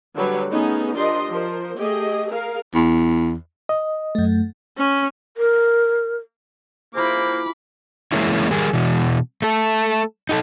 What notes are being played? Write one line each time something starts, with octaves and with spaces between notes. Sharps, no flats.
D3 F#3 G3 B4
A3 B3 C#4 D#4 G#4
F3 D4 G4 A#4 D#5 C6
F3 A#4 C5
A3 G4 G#4 D#5
G#4 A#4 F5
E2
D#5
F#2 A3
C#4
A#4
A#3 E4 F4 G#4 C5 B5 D6
E3 G#3 A#3 C#4 E4
D#3 G3 G#4 A#4
B2 E3
A3 A4
D#4 G4 A4